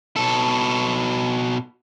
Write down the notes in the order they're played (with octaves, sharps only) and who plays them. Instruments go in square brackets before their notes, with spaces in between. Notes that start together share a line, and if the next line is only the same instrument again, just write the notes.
[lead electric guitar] B2 A4